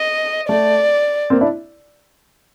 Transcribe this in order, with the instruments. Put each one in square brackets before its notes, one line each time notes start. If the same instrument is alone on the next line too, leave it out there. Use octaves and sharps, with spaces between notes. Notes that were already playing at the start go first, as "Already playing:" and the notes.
Already playing: [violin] D#5
[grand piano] A3 [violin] D5
[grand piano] A#3 C4
D4 E4